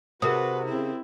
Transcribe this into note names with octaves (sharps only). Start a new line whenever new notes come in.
C3 F#4 G#4 A#4 B4 D#6
C#3 C4 E4